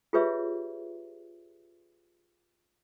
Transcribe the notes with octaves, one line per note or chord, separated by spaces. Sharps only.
F4 G4 G#4 B4 C#5 E5